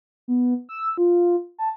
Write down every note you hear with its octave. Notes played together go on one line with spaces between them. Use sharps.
B3
E6
F4
A5